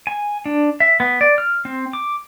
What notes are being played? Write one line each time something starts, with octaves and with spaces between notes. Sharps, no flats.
G#5
D4
E5
B3
D5
F6
C4
D6